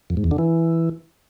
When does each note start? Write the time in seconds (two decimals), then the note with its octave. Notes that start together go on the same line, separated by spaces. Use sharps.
0.10 F2
0.17 G#2
0.24 E2
0.31 D3
0.38 E3